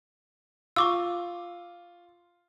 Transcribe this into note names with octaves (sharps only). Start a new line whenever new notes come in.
F4 C#6 D6 E6